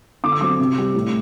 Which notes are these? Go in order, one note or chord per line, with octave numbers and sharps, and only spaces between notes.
D3 D6
E6
F#3 C4 D6
C3
G3 C4
A2